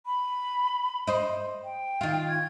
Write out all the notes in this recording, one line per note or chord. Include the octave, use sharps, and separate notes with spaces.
B5
C5 D#5
G5
D#3 F4
G#6